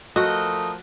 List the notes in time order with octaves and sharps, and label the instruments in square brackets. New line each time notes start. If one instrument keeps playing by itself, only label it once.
[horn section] F3 A3 A#4 [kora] F#4 [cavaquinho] D#5